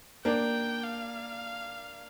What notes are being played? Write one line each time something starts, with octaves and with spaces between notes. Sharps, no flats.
A#3 D4 G5
F5